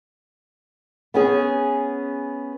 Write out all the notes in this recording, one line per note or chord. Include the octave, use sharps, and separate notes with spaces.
B3 C#4 G#4